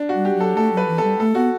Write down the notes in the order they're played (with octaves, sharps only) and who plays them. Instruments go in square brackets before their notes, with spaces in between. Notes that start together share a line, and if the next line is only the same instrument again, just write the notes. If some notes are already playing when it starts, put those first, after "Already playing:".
Already playing: [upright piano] D4
F#4
[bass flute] G3
[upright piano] G4
[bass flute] F#3 [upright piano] A4
[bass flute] A3 [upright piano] A4
[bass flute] F#3 [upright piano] B4
[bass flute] E3
[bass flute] G3 [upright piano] A4
[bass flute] A3 [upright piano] A4
[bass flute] B3 [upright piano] F#4